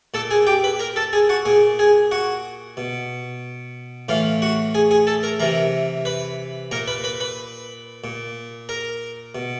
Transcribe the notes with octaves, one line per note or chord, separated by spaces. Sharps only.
A#2 A4 A5
G#4 G#5
G4 G5
B4 B5
A#4 A#5
A4 A5
G#4 G#5
F#4 F#5
A#2 G#4 G#5
G#4 G#5
F#4 F#5
B2
A2 E3 F4 F5
F#4 F#5
G#4 G#5
G#4 G#5
A4 A5
A#4 A#5
C3 E3 A#4 A#5
B4 B5
A#2 A#4 A#5
B4 B5
B4 B5
B4 B5
A#2
A#4 A#5
B2